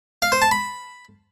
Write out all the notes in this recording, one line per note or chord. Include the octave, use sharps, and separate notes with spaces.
F5
C5
A5
B5